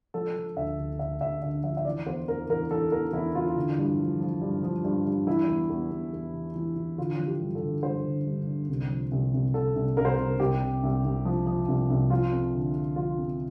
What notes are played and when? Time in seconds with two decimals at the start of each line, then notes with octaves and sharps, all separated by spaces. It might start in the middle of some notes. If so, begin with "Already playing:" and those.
0.14 F3 A4
0.36 F3
0.57 D2 E5
0.79 D2
0.99 D2 E5
1.21 D2 E5
1.42 D3 E5
1.64 F3 E5
1.77 E5
1.85 E3 D5
2.06 E2 C5
2.28 E2 A#4
2.49 E3 A#4
2.71 E3 A4
2.92 E2 A#4
3.13 E2 E4
3.35 E3 F4
3.56 D3
3.78 G2
3.99 F3
4.21 F3
4.42 G2
4.63 F3
4.85 G2
5.06 G2
5.27 E3 E4
5.48 E2
5.70 E2
5.91 E2
6.13 E2
6.33 E3
6.55 E3
6.76 E3
6.98 D3 F4
7.19 F3
7.26 G4
7.41 G2
7.55 A4
7.62 D3
7.83 G2 C5
8.05 D3
8.27 G2
8.47 D3
8.69 C2
8.90 F3
9.11 C2
9.34 C2
9.54 C2 A4
9.76 C2
9.97 C2 A#4
10.05 C5
10.12 A#4
10.18 C2
10.40 C2 G4
10.61 C3
10.83 C2
11.04 C2
11.25 F3
11.47 F3
11.68 C2
11.90 C2
12.10 F3 F4
12.32 F2
12.53 D3
12.75 D3
12.96 F3 F4
13.18 F2